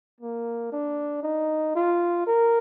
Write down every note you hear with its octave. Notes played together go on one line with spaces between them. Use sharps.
A#3
D4
D#4
F4
A#4